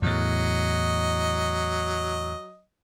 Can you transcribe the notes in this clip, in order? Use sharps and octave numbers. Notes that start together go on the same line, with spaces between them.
E2 A2 F#3 D#5